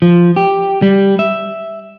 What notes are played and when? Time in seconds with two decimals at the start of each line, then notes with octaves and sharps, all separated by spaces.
0.02 F3
0.36 G4
0.82 G3
1.19 E5